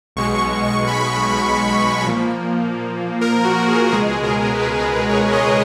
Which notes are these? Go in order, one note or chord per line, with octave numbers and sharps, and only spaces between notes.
B1 B2 G#3 C#6
C#6
C#6
B5
A#2 F3 A#3
A#4
F#4
G#4
C#2 B2 G#3 G#4
A#4
B4
B4
C#5
D#5